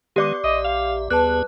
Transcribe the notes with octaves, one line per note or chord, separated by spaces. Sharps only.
D#3 G#3 B3 G4 D5 D6
A#1 D#5 E5
F5
D#2 G3 B3 G#4 B4 A5 F#6